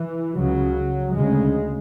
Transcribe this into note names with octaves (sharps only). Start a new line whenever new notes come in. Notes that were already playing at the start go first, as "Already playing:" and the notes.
Already playing: E3
C#2 C#3 F#3
D2 C#3 G#3